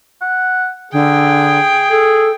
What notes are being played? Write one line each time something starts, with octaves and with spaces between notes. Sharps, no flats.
F#5
D3 G#4 G5
G#4 A4